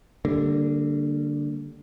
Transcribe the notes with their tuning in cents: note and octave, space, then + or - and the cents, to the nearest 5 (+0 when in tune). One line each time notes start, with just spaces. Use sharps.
D3 +0 G3 +0 A#3 -30